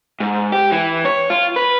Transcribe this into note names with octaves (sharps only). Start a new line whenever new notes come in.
G#2
G4
E3
C#5
F4
B4